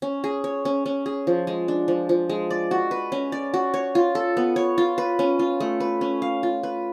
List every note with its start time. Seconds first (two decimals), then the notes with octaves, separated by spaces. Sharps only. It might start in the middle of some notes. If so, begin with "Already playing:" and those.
0.02 C#4
0.24 G#4
0.44 C#5
0.65 C#4
0.86 C#4
1.06 G#4
1.27 F3
1.47 G#3
1.68 D4
1.88 F3
2.09 F3
2.30 G#3
2.51 D5
2.71 F#4
2.91 B4
3.12 C#4
3.32 D5
3.54 F#4
3.74 C#5
3.95 F4
4.15 A4
4.37 B3
4.56 C#5
4.78 F4
4.98 B4
5.19 C#4
5.39 F4
5.60 A3
5.80 B4
6.01 C#4
6.22 F5
6.43 F4
6.63 B4